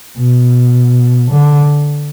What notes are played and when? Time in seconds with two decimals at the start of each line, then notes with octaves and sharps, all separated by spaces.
0.18 B2
1.32 D3